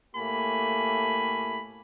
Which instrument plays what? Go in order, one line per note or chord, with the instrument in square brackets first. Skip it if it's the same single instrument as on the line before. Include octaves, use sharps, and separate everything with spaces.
[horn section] A2 A3 A#3 G4 G#5 B5